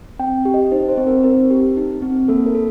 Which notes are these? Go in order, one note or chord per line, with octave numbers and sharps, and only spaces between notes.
C4 G5
G4
D#5
D#4 C5
C5
C4
A#4
C4 A#4
G4
D#4
C4
A#3 A4
A#4
A4